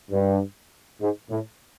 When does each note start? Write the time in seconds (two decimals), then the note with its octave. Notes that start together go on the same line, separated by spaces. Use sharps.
0.11 G2
1.00 G#2
1.30 A2